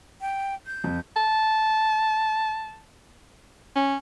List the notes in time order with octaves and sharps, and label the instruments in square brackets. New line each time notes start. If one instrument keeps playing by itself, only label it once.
[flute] G5
G6
[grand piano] F2
[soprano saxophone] A5
C#4